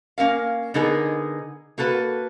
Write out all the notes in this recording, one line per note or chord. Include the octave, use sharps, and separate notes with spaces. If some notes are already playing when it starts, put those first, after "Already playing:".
A#3 C#4 A#4 F5
D3 B3 D#4 G#4 A#4
A#3 F#4 A4 B4